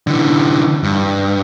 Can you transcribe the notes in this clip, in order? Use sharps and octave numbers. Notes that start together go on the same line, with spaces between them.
D3 E3
G2